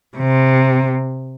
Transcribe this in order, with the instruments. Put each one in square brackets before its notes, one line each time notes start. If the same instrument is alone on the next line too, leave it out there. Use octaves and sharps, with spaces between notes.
[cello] C3